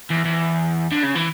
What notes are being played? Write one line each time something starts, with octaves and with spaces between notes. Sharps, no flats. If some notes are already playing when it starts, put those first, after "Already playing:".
E2
E2
D3
C#3
E3